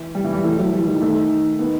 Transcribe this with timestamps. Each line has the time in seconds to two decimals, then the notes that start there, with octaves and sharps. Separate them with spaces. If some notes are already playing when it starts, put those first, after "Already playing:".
Already playing: E3
0.15 G3
0.25 E3
0.34 G3
0.44 E3 A3
0.59 F#3
0.73 E3 G3
0.88 D#3
1.01 D#3 A3
1.59 D#3 B3